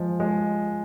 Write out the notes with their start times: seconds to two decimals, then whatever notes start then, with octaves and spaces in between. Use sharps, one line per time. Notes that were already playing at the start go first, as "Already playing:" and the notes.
Already playing: F3 G#3
0.20 G#3